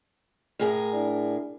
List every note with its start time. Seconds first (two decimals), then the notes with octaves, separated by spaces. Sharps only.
0.59 A2 G#4 A#4
0.93 D4 E4 D5